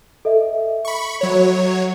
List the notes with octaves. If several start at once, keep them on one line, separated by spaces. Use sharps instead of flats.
A4 D#5 E5
B5 C#6
F#3 C#5